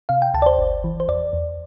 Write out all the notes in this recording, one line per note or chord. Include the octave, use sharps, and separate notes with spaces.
C3 F5
G5
D2 A5
D5
C5
G1
E3
C5
E2 D5
E2